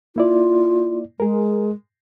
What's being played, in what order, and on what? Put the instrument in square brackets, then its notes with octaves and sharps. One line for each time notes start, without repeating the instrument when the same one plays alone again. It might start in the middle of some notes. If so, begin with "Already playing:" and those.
[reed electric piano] A#3 E4 D5 [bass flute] F4
[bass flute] G#3 [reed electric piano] G#4 A#4